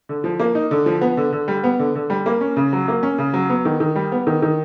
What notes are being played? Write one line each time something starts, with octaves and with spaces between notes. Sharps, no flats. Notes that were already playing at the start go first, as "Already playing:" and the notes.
D3
F3
A#3
D#4
D3
F3
B3
D3
D3
G3
B3
D3
D3
G3
A#3
C#4
C#3
F#3
A#3
C#4
C#3
F#3
B3
D#3
D#3
G3
B3
D#3
D#3